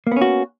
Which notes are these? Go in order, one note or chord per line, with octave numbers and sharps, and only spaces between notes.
A#3 B3 C#4 F#4